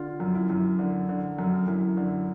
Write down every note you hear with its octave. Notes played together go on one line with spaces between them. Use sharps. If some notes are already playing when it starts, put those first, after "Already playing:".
Already playing: D3 F4
F#2
E4
F#2
D3
D3
F#2
F#2 E4
D3